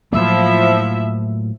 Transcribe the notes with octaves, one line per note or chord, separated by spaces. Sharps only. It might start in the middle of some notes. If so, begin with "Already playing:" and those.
A2 F3 F#3 A#3 E4 E5